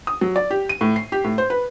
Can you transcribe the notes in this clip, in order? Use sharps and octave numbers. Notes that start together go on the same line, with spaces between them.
D#6
F#3
D5
G4
D#7
A2
C7
G4
A2
C5
B4